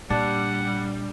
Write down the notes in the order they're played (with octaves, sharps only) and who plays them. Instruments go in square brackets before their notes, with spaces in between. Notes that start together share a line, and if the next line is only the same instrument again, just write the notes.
[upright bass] A#2 [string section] G3 [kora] D4 [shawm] F#5